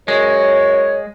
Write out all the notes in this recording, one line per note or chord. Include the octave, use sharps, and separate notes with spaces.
F#2 G#3 A#4 C#5